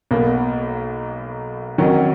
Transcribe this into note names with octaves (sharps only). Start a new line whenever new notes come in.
B1 B2 A#3
F2 D#3 F#3 C#4 F#4